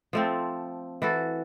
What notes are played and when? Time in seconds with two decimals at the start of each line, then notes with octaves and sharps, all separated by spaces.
0.13 F3 A3 C4
1.02 E3 F#4 A4